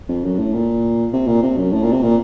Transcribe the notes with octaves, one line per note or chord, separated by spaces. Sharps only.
F2
F#2
A2
A#2
C3
A#2
C3
F#2
A2
A#2
C3
A#2